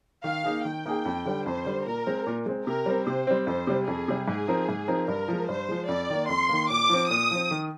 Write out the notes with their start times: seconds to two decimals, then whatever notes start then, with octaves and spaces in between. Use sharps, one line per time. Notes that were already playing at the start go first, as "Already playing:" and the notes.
0.24 D#3 F5
0.44 A#3 D#4 G#4
0.65 D#3 G5
0.85 A#3 D#4 G#4
1.05 F2
1.25 D3 G3
1.45 F2 C5
1.65 D3 G3
1.86 A#2 A#4
2.06 G#3 C4
2.26 A#2
2.46 G#3 C4
2.67 C3 A#4
2.86 G3 C4
3.07 C3 C5
3.27 G3 C4
3.47 F2 C5
3.67 C3 G3
3.87 F2 G#4
4.08 C3 G3
4.28 G#2 G#4
4.48 F3 C4 D#4 A#4
4.69 G#2
4.88 F3 C4 D#4 A#4
5.08 G2 A#4
5.28 F3 G#3
5.48 G2 C5
5.69 F3 G#3
5.89 F2 D5
6.10 D#3 A#3
6.29 F2 C6
6.49 D#3 A#3
6.70 A#2 D6
6.89 F3 C4
7.10 A#2 D#6
7.31 F3 C4
7.51 D#3